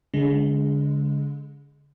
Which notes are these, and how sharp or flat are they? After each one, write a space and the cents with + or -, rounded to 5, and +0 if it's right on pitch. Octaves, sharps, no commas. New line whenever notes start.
D3 -40 G#3 +0